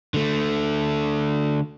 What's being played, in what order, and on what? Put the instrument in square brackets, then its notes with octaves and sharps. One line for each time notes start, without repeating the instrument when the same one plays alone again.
[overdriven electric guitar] D3 A3